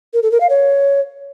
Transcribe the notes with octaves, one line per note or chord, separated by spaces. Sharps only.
A#4
A4
A#4
F5
C#5